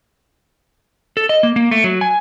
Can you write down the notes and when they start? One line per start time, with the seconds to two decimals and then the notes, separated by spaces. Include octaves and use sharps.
1.17 A4
1.29 D#5
1.43 A#3
1.56 A#3
1.71 A3
1.84 F#3
2.01 G#5